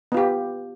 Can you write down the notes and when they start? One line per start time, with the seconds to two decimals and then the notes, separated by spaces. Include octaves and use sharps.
0.12 B3
0.14 F4
0.17 G4